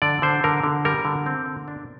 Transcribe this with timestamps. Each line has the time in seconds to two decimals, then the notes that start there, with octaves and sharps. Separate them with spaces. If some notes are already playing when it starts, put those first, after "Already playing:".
0.02 D3 D5
0.22 D3 C5
0.44 D3 A#4
0.63 D3
0.85 G3 A#4
1.05 D3
1.26 C4
1.46 D3
1.68 D4